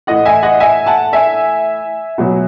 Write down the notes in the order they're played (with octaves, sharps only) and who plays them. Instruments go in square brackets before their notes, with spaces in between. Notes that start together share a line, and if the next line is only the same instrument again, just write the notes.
[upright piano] A2 E3 D#5 F#5
E5 G#5
D#5 F#5
E5 G#5
F#5 A5
E5 G#5
B2 F#3